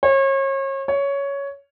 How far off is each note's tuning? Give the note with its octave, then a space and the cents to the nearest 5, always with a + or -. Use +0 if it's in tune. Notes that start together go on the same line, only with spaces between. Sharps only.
C#5 -35
C#5 +10